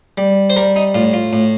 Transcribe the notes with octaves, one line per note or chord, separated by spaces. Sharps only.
G3
C5
G3 A#4
D#4
A2 F4
F4
A2